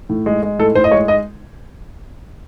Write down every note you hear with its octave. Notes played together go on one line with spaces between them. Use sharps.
A2
G#3
G#3
A2 A4
A2 C5
D#5
G#3 C#5
D#5